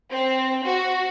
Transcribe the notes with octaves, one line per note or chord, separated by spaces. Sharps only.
C4
F#4